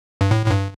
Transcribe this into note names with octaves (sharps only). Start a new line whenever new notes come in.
G2
A2
A2
G2